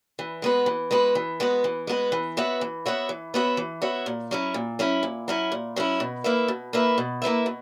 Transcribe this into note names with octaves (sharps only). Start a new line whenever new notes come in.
E3
G#3 B3 F#4 B4
E3
G#3 B3 F#4 B4
E3
G#3 B3 F#4 B4
E3
G#3 B3 F#4 B4
E3
B3 F#4 C#5 E5
E3
B3 F#4 C#5 E5
E3
B3 F#4 C#5 E5
E3
B3 F#4 C#5 E5
A#2
F#3 C#4 E4
A#2
F#3 C#4 E4
A#2
F#3 C#4 E4
A#2
F#3 C#4 E4
B2
A#3 E4 B4 E5
B2
A#3 E4 B4 E5
B2
A#3 E4 B4 E5
B2